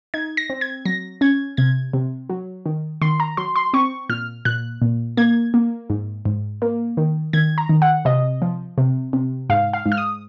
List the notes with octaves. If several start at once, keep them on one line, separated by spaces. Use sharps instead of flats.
D#4 G#6
A#6
C4
G#6
F#3 A#6
C#4 G#6
C3 G#6
C3
F#3
D#3
D#3 C6
A#5
F#3 C6
C6
C4 C#6
A#2 F6
A#2 F#6
A#2
A#3 G#6
A#3
G#2
G#2
A#3
D#3
D#3 G#6
A#5
D#3
F#5
C3 D#5
F3
C3
C3
G#2 F5
F5
G#2
F6
D#6